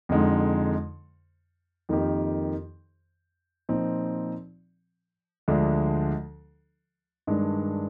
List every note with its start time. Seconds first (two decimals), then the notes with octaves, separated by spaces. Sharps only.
0.09 F2 D3 G#3 D#4
1.89 F2 D#3 A#3 D#4 G4
3.69 A#2 F3 C4 D#4
5.48 D2 D3 F3 G#3 D4
7.27 G2 D#3 G#3 D4